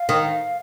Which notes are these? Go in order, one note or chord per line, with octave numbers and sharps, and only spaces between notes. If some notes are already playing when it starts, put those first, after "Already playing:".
Already playing: F5
D#3